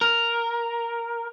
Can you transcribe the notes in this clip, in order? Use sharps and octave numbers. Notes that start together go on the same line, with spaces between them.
A#4